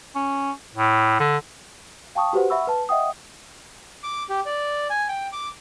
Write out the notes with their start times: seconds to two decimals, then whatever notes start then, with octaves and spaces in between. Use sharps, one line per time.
0.15 C#4
0.75 A2
1.20 D3
2.15 F5 G5 A5 C#6 D#6
2.33 F#4 G4 B4 C5 F#5
2.50 E5 F#5 B5 C#6 E6
2.67 B4 A5
2.89 D#5 E5 F#5 G5 D#6
4.03 D6
4.30 G4
4.46 D5
4.90 G#5
5.09 G5
5.33 D6